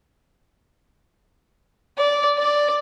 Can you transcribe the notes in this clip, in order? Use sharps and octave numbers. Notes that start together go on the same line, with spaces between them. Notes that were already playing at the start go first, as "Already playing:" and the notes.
D5
D5